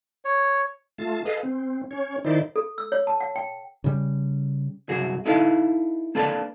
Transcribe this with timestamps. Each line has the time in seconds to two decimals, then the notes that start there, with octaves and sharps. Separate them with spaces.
0.25 C#5
0.98 A3 F4 A5
1.25 G#4 A4 B4 D#5 F5
1.43 C4
1.91 C#4 C#5
2.25 D#3 D#4 E4 C5 D5
2.56 A4
2.78 E6
2.92 C#5
3.07 A5
3.20 F#5
3.36 G5
3.84 C#3 G3
4.89 C2 F#2 F#4 G#4
5.26 D#4 E4 A4 B4 F5
6.15 A#3 D4 A4 B4 D5 A5